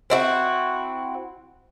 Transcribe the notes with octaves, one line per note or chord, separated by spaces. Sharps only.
C4 E4 F#4